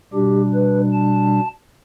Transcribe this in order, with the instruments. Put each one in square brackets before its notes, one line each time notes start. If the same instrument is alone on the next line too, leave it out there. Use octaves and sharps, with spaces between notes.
[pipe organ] B2 G3 D4 G4
B4
A5